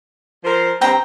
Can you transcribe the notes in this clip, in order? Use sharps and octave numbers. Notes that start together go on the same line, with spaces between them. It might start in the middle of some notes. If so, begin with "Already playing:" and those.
F3 A#4 C5
G2 C3 C4 G5 A#5